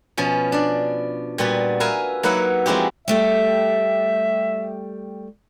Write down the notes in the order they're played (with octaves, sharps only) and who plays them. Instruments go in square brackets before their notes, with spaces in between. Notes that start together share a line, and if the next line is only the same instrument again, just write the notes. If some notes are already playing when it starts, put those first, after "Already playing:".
[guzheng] B2 F3 C#4
D4 D5
A#2 G3 B3 F#4
A#4 B4 E5 F5 G#5
F#3 A#3 D#4 B4 E5 F#5
F3 G#3 C4 E4 F#4 G4
[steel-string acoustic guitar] G3 A3 G4 [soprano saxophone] E5